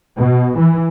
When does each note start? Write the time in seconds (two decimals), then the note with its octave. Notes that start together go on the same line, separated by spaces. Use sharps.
0.18 B2
0.58 E3